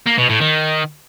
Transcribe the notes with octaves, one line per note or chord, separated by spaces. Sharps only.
A#3
B2
A2
D#3